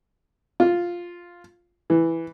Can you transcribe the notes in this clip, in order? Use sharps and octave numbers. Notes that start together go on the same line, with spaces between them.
F4
E3